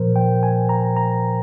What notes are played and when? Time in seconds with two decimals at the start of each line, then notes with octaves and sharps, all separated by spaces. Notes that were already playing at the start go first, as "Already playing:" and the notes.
Already playing: A#2 F3 A#4 C5
0.16 G5
0.43 G#5
0.69 A#5
0.97 A#5